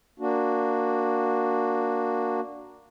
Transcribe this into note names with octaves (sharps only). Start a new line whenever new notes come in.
A#3 D4 F#4